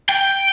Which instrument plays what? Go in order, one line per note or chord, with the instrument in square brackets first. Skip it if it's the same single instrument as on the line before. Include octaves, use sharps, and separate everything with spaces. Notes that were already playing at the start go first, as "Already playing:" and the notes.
[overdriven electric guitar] G5